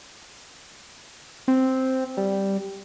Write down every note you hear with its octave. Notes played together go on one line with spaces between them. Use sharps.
C4
G3